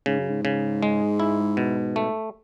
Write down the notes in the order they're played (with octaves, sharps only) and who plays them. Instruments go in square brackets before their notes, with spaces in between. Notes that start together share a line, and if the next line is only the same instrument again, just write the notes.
[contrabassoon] G#2 [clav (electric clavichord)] C#3
[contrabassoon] F#2
G#2
[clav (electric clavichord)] C#3
G#3
E4
B2
A3